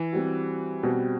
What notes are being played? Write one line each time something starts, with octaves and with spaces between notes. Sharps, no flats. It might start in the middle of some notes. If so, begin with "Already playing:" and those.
Already playing: E3
G3 C4 F#4
B2 G3 C4 F#4